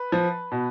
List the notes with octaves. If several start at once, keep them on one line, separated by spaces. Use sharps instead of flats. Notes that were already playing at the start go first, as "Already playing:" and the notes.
Already playing: B4
F3
B2